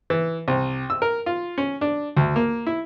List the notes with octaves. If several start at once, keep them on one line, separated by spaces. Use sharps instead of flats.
E3
C2
E6
A#4
F4
C#4
D4
D2
A#3
E4